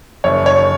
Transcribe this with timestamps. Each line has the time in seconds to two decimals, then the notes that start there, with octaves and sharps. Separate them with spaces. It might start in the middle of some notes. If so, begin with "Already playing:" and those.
0.24 F#1 C#5
0.46 C#5